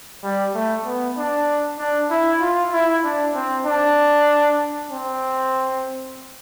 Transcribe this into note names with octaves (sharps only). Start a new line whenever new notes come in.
G3
A3
B3
D4
D4
E4
F4
E4
D4
C4
D4
C4